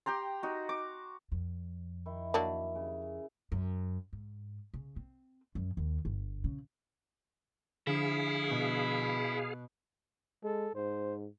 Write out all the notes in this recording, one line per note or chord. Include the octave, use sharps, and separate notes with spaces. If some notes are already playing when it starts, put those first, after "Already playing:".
G4 G5 A#5 C6
D#4 F#4
D6
F2
D#3 E4
F#3 A#3 D4
C#3
F#2
G#2
C#3
C4
F#2
D#2
G1
C#3
D3 F3 D4 E4 G#4 F5
B2
G#3 A4
G#2 C5